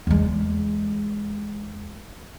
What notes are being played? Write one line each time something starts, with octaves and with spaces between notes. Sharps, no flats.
E2 G#3